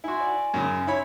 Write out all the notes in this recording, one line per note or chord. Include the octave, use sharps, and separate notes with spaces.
E4 F#4 G#5 C6
D5
F#2 C#3
E4 C#5 B5